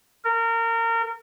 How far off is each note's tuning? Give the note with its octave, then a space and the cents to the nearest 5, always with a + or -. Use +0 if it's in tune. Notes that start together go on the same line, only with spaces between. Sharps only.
A#4 -25